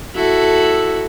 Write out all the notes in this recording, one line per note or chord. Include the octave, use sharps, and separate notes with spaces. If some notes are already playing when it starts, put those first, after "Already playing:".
E4 F#4 A4